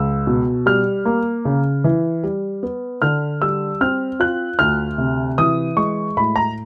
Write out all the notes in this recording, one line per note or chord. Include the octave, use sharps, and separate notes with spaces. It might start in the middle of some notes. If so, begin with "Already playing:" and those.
Already playing: C#2 E6
B2
G3 F6
A#3
C#3
E3
G3
B3
D3 F6
G3 E6
C4 F6
F4 F#6
D2 F6
C3
E3 D#6
G#3 C#6
A2 B5
A#5